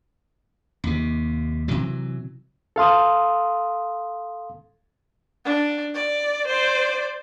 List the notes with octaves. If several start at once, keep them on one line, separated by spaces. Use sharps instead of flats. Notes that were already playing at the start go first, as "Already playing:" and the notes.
D#2 C3
C3 E3 F#3
A4 F5 C6 D#6
D4
D5
C5 D5